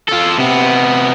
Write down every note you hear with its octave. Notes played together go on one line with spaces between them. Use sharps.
F4 A4
C3 B3